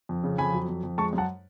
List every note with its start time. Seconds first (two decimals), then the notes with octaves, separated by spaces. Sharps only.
0.09 F2
0.24 C#3
0.38 F2 G#5 B5
0.53 F#3
0.69 F2
0.83 F2
0.98 G#3 A5 C#6
1.13 F#2
1.18 F#5 A5